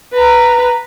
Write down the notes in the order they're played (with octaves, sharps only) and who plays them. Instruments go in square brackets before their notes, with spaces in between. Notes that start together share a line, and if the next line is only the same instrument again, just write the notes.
[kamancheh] B4 A#5